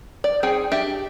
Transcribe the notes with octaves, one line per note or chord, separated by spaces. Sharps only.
D5
C4 D#4 G#4 G5
D4 G4 E5